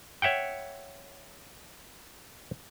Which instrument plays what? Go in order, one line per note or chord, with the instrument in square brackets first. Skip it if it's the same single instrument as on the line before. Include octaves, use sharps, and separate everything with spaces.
[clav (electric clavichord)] C#5 E5 F#5 G5